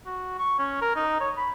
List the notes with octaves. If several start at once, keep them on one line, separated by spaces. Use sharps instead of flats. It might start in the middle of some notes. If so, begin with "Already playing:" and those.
F#4
C#6
C#4
A#4
D#4
C#5
B5